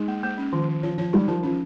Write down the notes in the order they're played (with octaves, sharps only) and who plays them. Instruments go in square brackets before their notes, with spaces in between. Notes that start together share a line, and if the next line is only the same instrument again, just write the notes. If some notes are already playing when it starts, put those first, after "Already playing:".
Already playing: [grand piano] G#3 [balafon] D#4
[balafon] A#3
A#3
C#4
[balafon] D#3 [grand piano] F3
[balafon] D#3
[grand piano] F3 [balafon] C#5
[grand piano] F3 [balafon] C#5
[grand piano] G3 [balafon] D#4
[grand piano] F3 [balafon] A#4
[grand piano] F3 [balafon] C#4